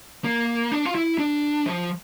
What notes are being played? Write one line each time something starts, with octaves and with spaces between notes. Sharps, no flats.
A#3
D4
F4
E4
D4
F3